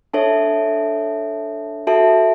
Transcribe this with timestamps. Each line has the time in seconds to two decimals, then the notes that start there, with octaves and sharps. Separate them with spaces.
0.14 D4 A4 C#5 E5 A5
1.87 F#4 A4 E5 A5